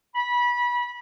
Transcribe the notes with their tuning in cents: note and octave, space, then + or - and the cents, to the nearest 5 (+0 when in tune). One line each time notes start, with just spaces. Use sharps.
B5 -25